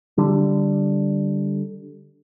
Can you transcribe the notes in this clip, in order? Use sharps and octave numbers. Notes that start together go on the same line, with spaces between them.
D3 G3